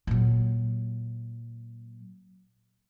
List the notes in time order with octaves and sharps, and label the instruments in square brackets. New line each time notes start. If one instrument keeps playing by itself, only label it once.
[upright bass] A#2 F#3